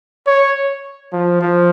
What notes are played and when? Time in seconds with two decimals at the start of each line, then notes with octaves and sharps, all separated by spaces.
0.27 C#5
1.13 F3
1.42 F3